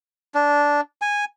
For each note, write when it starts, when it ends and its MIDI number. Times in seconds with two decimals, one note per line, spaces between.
0.35 0.81 62
1.02 1.25 80